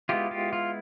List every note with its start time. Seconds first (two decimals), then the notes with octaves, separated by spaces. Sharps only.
0.09 G#3 B3 E4 F4 G4
0.31 F4 G4
0.53 F4